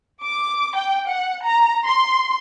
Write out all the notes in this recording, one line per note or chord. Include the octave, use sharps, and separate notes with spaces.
D6
G5
F#5
A#5
C6